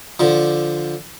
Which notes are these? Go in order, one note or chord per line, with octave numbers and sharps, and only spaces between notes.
D3 F3